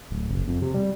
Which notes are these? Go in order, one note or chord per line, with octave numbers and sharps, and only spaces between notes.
D1
F#1
F2
C3
G3